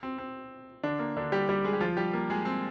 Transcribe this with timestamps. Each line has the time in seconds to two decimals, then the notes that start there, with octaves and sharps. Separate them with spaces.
0.03 C4
0.18 C4
0.83 D3 D4
0.99 A#3
1.17 D3 D4
1.32 G3 G4
1.49 G3 G4
1.64 G#3 G#4
1.73 G4
1.80 F3 F4
1.97 G3 G4
2.13 A#3
2.30 G#3 G#4
2.45 C4